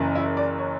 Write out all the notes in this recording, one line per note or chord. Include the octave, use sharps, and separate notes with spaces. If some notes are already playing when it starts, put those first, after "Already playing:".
Already playing: F#1 F#2 E3
E4
D5
C#5